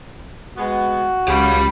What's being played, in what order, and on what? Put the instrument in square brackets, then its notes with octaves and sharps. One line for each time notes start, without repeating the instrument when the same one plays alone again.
[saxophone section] G#3 B3 [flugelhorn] F#4
[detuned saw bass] C#2 [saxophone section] C#3 [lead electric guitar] G4 B5